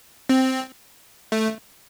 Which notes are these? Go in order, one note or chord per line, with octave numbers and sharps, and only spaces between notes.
C4
A3